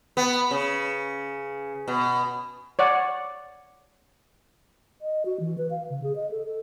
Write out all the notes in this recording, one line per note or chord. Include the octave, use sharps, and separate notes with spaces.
B3
C#3
B2
C#5 D5 F#5
D#5
F#4
E3
B4
F5
C#3
G#4
D#5
A4
A4